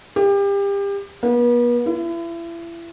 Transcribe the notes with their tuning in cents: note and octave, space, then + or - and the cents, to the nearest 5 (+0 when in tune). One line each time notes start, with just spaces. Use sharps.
G4 +30
B3 -40
E4 +35